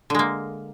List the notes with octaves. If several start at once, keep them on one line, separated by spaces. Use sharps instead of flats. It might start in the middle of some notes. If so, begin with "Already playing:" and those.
D3 G#3 A#3